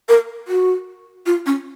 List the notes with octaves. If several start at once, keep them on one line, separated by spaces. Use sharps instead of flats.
A#4
F#4
F4
C#4